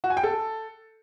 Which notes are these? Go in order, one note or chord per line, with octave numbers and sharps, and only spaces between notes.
F#4
G#5
G5
A4